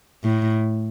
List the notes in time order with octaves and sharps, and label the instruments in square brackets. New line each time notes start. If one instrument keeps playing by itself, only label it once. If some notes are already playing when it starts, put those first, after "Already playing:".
[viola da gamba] A2